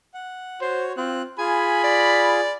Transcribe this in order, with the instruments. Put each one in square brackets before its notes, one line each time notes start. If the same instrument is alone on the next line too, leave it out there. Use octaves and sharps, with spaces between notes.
[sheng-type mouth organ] F#5
[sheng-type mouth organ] F#4 C#5 [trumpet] C5
[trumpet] C4 [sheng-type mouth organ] F4 F#6
[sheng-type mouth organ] F4 G#4 [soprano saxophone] G#5 [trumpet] B5
[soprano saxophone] D5